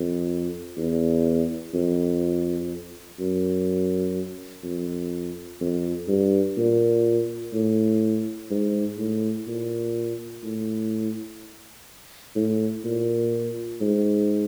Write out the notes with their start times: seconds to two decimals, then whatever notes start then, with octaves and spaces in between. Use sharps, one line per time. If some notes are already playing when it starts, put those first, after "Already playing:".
Already playing: F2
0.77 E2
1.74 F2
3.19 F#2
4.63 F2
5.61 F2
6.08 G2
6.57 A#2
7.53 A2
8.50 G#2
8.98 A2
9.47 A#2
10.44 A2
12.35 A2
12.85 A#2
13.81 G#2